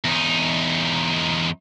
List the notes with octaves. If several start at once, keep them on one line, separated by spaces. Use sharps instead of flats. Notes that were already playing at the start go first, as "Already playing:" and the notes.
E2 D#4